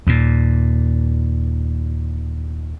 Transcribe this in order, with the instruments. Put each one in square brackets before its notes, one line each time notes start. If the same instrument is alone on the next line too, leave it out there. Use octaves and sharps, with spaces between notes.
[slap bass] D#2 A#2